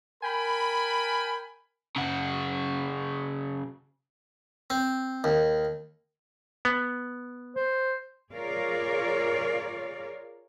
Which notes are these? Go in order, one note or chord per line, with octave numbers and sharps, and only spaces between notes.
A#4 G5 G#5 B5
C#3 F#4
C4
D#2
B3
C5
F4 G#4 A#4 C#5 D5 F5